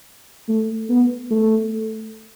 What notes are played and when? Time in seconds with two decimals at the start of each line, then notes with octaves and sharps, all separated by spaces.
0.49 A3
0.89 B3
1.31 A3